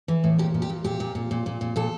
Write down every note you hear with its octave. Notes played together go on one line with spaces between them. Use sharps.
E3
A2
A#2 G4
A#2
G4
A#2
A#2 G4
A#2
A#2
A#2
A#2
A#2
A#2 A4